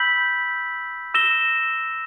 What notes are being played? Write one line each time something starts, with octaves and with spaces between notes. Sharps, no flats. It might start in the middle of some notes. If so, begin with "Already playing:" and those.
Already playing: B5 E6 G6 B6 F#7
E6 A#6 E7 G7